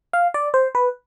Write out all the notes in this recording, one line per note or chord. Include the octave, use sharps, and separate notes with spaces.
F5
D5
C5
B4